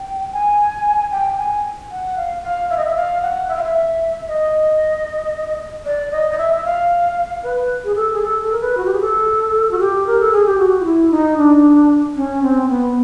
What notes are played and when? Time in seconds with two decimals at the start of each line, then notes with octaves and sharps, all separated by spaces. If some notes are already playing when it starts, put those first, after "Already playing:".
Already playing: G5
0.33 G#5
1.12 G5
1.38 G#5
1.91 F#5
2.17 F5
2.43 F5
2.70 E5
2.77 D#5
2.85 E5
2.96 F5
3.22 F#5
3.49 E5
3.56 F5
3.64 E5
4.28 D#5
5.86 D5
6.11 D#5
6.31 D#5
6.38 E5
6.57 E5
6.64 F5
7.43 B4
7.85 G#4
7.95 A4
8.13 G#4
8.22 A4
8.43 A4
8.52 A#4
8.61 B4
8.77 F#4
8.85 G4
8.93 G#4
9.00 A4
9.71 F#4
9.79 G4
10.07 A#4
10.20 A4
10.32 G#4
10.46 G4
10.58 F#4
10.80 F4
10.85 E4
11.11 D#4
11.38 D4
12.16 C#4
12.43 C4
12.63 C4
12.69 B3